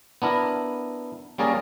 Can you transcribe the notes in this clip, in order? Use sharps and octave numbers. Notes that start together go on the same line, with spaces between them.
B3 D4 E4 A#4
G3 A#3 C#4 G#4 A#4 D5